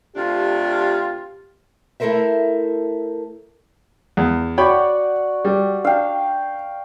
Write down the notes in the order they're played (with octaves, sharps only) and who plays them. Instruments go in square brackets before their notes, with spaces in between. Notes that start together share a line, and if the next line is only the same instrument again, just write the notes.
[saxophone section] C3 A3 D4 [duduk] F4 [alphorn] G4
[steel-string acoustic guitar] A3 E4 A4 A#4 C5 E5
[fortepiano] E2
[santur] F#4 D5 F#5 [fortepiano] C#5 G5 B5
[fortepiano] G3
[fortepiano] D4 [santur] F5 G5